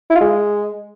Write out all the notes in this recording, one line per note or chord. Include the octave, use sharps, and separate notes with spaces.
E4
F4
G#3